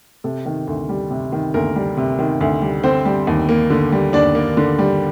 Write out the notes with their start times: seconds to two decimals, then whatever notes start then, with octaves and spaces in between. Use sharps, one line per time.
0.24 C3 A4
0.46 D#3
0.67 D2
0.89 G3
1.11 C3
1.32 D#3
1.54 D2 A#3 A#4
1.76 G3
1.97 C3
2.19 D#3
2.41 D2
2.62 G3
2.84 D3 C4 C5
3.05 G3
3.27 D#2
3.49 A#3
3.70 D3
3.92 G3
4.13 D#2 D4 D5
4.35 A#3
4.57 D3
4.79 G3